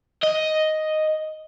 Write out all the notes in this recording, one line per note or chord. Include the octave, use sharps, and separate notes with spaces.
D#5